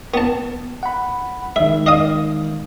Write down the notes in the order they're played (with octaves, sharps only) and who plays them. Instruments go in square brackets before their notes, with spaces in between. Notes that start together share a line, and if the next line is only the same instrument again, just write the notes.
[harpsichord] B3 A5
[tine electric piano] F#5 B5
[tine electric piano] D#3 G#3 [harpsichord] E5
[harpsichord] D#5 F5 D#6